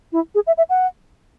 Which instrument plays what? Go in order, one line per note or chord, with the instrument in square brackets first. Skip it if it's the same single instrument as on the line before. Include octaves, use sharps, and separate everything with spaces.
[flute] E4
G#4
E5
E5
F#5